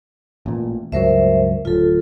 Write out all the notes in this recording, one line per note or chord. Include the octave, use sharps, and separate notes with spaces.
A1 A#2
C#2 G2 F#3 A#4 C5 E5
D1 F4 A4